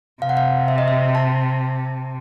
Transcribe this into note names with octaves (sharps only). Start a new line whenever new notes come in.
C3 F5
F#5
F5
E5
D#5
E5
A5